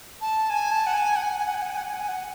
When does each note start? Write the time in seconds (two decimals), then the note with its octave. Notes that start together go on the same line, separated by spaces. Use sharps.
0.21 A5
0.50 G#5
0.72 A5
0.86 F#5
0.94 G#5
1.16 F#5
1.23 G#5
1.31 F#5
1.39 G#5
1.46 F#5
1.55 G#5
1.62 F#5
1.70 G#5
1.77 F#5
1.86 G#5
1.93 F#5
2.01 G#5
2.08 F#5